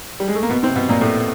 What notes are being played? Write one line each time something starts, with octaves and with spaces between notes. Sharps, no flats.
G3
G#3
A3
A#3
B2 B3
C3 C4
B2 B3
A#2 A#3
A2 A3